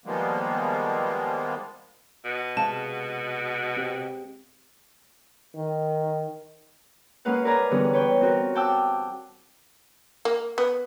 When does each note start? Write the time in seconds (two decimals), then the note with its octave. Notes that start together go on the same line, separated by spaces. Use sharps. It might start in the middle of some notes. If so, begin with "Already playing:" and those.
0.06 D#3 F3 G3 G#3 A#3 B3
2.25 B2
2.57 C3 G#3 F5 F#5 A5
3.77 C4 G4
5.55 D#3
7.25 G#3 A#3 C#4 B4 F5 F#5
7.45 A#4 B4 D5 F5 G#5 A#5
7.71 D3 E3 G3 B3 C#4 G#4
7.93 B4 C#5 G5
8.21 C4 F4 F#4 A#4
8.55 F#5 G5 A5 D6 E6
10.25 A#3
10.58 B3